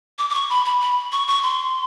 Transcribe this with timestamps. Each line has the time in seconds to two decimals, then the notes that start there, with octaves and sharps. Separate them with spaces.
0.19 D6
0.30 D6
0.35 C#6
0.50 B5
0.65 B5
0.81 B5
1.12 C#6
1.28 C#6
1.43 C6